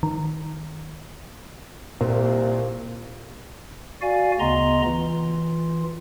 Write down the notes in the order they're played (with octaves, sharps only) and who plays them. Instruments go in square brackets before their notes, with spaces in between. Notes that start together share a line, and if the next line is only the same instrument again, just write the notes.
[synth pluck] D#3
[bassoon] C2 [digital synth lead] A#2
[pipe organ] F#4 D5 F5 G#5
D2 C#3 B3 D#5 A#5 C6
E3 F4